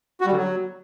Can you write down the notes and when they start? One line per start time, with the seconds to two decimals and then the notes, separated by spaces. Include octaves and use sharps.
0.21 F#4
0.26 G3
0.32 D3
0.37 F#3